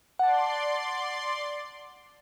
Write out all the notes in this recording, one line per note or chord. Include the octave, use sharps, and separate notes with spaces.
D5 F#5 A5 C6